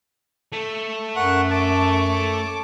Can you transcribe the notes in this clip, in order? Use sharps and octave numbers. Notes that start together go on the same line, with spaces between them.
A3
F#2 A#4 F#5 C#6 F#6
C#5 A5 D6